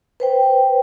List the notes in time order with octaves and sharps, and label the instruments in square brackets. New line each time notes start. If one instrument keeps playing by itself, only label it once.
[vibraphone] B4 C5 G5